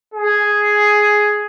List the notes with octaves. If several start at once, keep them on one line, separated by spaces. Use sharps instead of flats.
G#4